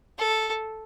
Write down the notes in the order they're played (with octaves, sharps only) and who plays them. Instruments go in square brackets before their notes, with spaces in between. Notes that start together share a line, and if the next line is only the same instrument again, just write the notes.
[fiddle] A4